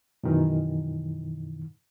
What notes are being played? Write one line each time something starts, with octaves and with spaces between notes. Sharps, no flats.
F#2 B2 D#3 E3